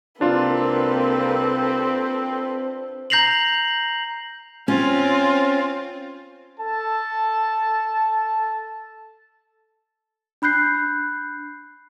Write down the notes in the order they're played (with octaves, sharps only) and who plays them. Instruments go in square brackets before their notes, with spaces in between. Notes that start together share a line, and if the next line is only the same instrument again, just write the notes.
[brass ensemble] C2 A#3 [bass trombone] C4 [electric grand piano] D4 F4 [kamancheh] A4 B4
[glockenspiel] A#5 G6 A#6 C7 F7 F#7
[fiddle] C4 F4 [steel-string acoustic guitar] C#4
[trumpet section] A4 A5
[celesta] D4 B5 F#6 G6 C7